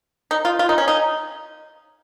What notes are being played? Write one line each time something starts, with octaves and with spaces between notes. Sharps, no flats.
D#4
F4
F4
D#4
C#4
D#4